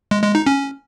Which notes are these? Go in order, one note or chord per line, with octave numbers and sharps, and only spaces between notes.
G#3
G#3
D#4
C#4